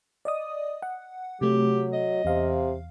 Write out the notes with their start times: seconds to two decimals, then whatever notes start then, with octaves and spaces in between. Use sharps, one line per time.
0.25 D5 D#5 D#6
0.82 F#5
1.41 C3 F#3 A3 G4
1.93 D#5
2.25 E2 C3 F5